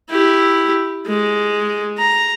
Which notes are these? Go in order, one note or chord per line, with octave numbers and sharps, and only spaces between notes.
E4 G4
G#3
A#5